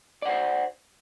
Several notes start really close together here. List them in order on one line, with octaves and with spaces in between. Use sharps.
D5 F#5 C5